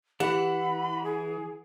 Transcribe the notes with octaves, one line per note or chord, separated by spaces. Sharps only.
E3 G4 F#5 B5
G#4